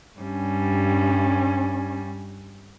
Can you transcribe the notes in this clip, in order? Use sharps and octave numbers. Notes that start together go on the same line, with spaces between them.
G2 G3 C#4